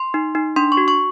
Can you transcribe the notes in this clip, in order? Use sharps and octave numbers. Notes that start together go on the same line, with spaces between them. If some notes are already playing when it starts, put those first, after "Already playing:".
Already playing: C6
D#4
D#4
D4 C6
C#6
F#4
C#6